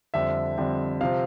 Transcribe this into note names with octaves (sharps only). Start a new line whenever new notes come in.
F2 D3 G3 C4 E5
F2 D3 G3 C4
C3 F3 C4 F5